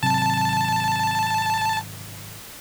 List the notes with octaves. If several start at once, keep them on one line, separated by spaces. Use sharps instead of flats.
G#1 C3 F#3 A5